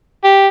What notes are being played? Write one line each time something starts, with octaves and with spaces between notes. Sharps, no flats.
G4